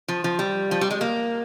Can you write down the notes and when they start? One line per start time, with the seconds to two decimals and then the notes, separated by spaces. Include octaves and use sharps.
0.08 F3
0.24 F3
0.39 G3
0.71 F3
0.81 G3
0.91 G#3
1.01 A#3